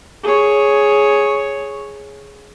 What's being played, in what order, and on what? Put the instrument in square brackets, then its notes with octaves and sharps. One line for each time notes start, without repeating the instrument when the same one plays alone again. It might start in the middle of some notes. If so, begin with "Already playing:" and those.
[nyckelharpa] G#4 C#5